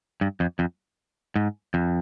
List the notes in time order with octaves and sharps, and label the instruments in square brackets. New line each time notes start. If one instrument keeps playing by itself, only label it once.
[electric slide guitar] G2
F2
F2
G#2
F2